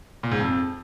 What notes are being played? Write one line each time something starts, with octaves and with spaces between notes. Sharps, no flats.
A#2
G#2
F2